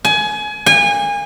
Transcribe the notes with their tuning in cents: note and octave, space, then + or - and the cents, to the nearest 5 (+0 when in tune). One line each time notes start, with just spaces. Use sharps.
G#5 +25
G#5 -30